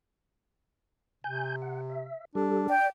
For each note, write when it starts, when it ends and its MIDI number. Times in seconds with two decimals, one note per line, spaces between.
1.24 2.12 48
1.24 1.56 80
1.24 1.56 91
1.62 1.81 78
1.90 2.25 76
2.35 2.67 55
2.35 2.73 62
2.35 2.67 67
2.35 2.67 69
2.70 2.90 74
2.70 2.87 79